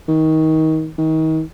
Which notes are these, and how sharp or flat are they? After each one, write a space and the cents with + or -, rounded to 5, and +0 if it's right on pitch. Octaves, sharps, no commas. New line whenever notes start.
D#3 +25
D#3 +35